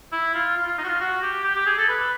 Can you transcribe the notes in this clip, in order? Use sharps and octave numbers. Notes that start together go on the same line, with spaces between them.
E4
F4
F4
F4
D#4
F#4
F4
F#4
G4
G4
G4
G#4
A4
B4